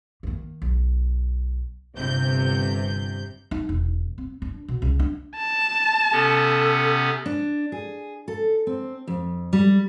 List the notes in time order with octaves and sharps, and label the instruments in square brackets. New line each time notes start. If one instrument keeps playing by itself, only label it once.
[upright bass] D#3 A#3
B1
[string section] G1 C3 G6
[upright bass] D#4
E1
C4
D4
B2
C#2
D4
[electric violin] A5
[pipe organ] C3 B3 C#4 [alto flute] A4
[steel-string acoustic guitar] D4
G#4
A4
C4
F2
G3